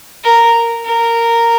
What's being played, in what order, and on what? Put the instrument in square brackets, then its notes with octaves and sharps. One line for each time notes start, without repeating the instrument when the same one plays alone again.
[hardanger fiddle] A#4
A#4